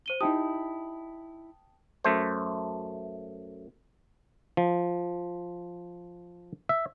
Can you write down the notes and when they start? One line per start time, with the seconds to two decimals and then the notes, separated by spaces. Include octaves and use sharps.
0.06 C5 D#7 G7
0.21 D#4 E4 G4 G5 A5 D#6
2.04 F#2 A3 C5
4.57 F3
6.69 E5